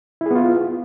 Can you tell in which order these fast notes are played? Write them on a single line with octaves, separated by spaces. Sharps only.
E4 G#4 B3 F4